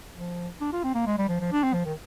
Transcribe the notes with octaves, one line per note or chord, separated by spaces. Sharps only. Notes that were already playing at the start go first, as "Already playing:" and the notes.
F3
D4
F4
C4
A#3
G#3
G3
F3
F3
D4
C4
F3
D#3